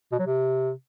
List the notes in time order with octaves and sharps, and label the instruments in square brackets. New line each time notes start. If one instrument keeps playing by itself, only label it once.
[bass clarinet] B2
F#3
C3